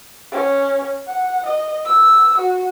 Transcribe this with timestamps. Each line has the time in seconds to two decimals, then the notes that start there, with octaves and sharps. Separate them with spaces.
0.32 C#4
1.07 F#5
1.46 D#5
1.84 E6
2.38 F#4